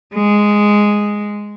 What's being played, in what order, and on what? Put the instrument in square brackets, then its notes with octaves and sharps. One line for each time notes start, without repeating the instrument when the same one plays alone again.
[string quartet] G#3